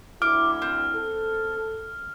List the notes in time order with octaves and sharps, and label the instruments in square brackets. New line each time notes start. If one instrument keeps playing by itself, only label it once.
[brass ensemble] D2 E4 [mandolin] D6 [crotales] F6
[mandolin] C4
[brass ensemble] A4